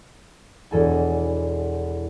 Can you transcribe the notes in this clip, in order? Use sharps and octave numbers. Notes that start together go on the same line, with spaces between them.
E1 E2 A4 G#5